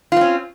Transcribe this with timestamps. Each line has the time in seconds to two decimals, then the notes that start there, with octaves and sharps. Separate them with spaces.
0.12 F4
0.16 C4
0.21 C#4